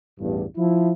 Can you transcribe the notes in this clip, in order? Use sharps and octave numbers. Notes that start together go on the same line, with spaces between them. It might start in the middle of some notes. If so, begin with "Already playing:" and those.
A1 E2 G2
F3 E4